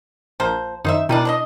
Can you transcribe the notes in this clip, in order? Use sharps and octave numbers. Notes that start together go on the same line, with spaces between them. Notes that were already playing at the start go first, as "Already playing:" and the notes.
A#1 F3 A#3 C5
F#2 D#3 D#4 C5 E5
B2 D#3 G3 D4 E4 D#7
D4 C5 D#5